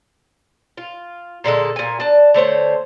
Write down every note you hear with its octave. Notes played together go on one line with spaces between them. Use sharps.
F4
A#2 D3 G#3 A4
A#2 G#5
D4 A5
D3 A3 C5 C#5